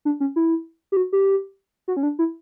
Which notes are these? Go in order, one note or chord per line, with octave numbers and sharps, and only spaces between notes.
D4
C#4
E4
G4
F#4
G4
F#4
C#4
D4
E4